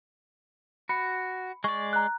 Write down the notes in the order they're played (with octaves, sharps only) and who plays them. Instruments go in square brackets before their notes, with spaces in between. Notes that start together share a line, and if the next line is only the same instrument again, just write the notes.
[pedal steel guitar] F#4 [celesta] B5 C#7
[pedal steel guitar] G#3 D5 [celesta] C#6
[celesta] A#5 F#6